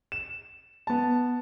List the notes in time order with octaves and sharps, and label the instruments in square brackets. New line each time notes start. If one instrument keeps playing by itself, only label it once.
[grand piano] E7
B3 A5